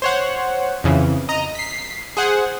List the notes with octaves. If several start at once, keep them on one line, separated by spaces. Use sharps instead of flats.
C5 C#5 F#5
F2 C#3 E3
D#5 A#5
B6 C7
G#4 C5 F#5